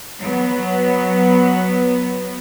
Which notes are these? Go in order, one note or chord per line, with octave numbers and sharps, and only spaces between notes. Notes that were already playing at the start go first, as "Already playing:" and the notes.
F#3 B3